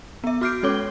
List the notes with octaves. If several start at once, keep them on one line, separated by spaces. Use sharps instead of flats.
B3 E5
F#4 D6 F6 G6 C7 D7
G#3 C#4 A4 C#5 D6 G7